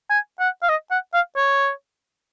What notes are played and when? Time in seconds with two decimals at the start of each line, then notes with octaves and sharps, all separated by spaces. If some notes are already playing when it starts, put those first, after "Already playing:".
0.10 G#5
0.40 F#5
0.63 F5
0.69 D#5
0.91 F#5
1.14 F5
1.37 C#5